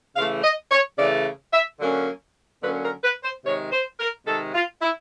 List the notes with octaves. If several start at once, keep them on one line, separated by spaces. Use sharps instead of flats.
C#3 E3 A3 F5
D#5
C#5
C#3 E3 A3 D5
E5
D3 F#3 A#3 C#4
D3 F#3 A#3 C#4 B4
A#4
B4
C5
C3 D#3 G#3 C#5
C5
A#4
C3 D#3 G#3 A4
F4
E4